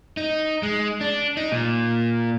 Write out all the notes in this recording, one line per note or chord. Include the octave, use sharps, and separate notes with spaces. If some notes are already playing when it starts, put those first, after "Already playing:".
D#4
G#3
D4
D#4
A#2